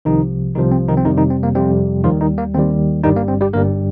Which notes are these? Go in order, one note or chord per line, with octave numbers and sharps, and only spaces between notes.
C2 C3 D#3 F3 D#4
C2 C3 D#3 F3 D#4
C4
D#3 D#4
C4
F2 C3 D#3 G3 D#4
D#3 D#4
C4
A#3
F2 C3 G3 C4
D#2 D#3 F3 G3 F4
D#3 D#4
A#3
D#2 D#3 G3 C4
G1 G2 D#3 G3 D#4
A#3
C4
G3 G4
G1 G2 G3 A#3 A#4